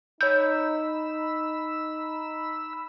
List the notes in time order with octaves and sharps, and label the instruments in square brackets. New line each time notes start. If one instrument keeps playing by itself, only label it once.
[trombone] D#4 [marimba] C#5 G6 [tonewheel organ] B5 E6